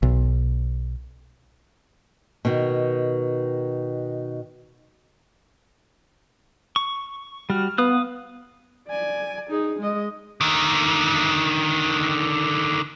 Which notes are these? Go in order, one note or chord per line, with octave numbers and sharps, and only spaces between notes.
B1
B2 D#3
C#6
G3 F#4 F6
B3 F5 D#6 F#6
D5 G#5
D#4 G#4
G#3 D#5
D3 D#3